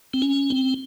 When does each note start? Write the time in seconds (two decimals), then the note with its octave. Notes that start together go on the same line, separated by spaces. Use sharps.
0.14 C4
0.22 C#4
0.50 C4